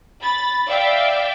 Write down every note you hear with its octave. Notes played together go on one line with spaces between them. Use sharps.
B5 A6
D5 E5 F5 G5